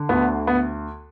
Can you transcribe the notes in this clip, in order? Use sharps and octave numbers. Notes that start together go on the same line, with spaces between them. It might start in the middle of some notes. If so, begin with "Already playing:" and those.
Already playing: D3
D2 B3
B3